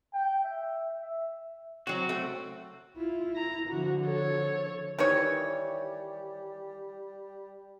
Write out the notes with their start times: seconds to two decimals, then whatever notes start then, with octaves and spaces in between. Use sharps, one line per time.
0.14 G5
0.44 E5
1.02 E5
1.87 F#3 C4 F#4
2.09 A3 C4
2.97 E4 F4
3.36 A#5
3.69 D3 F3 F#4
4.05 A4 C#5
4.99 D#3 E3 G3 C#5